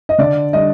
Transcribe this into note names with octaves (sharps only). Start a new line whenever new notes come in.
D#5
D3 D5
G3 D4 D#5